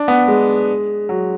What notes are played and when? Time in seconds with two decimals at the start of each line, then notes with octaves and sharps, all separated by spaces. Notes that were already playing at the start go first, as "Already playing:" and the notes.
Already playing: D4
0.08 B3
0.28 G#3
1.09 F#3